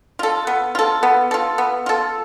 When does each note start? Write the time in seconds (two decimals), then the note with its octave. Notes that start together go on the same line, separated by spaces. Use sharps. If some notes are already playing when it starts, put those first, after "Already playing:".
0.19 F4 A4
0.47 B3
0.75 F4 A4
1.03 B3
1.31 F4 A4
1.58 B3
1.86 F4 A4